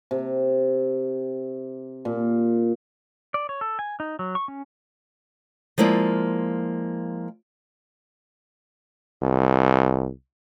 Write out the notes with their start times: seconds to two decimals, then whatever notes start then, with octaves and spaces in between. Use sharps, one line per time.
0.11 C3
2.05 A#2
3.34 D5
3.49 C#5
3.61 A4
3.79 G#5
4.00 D#4
4.19 F#3
4.35 C#6
4.48 C#4
5.78 F3 G#3 A#3 E4 D5
9.22 C2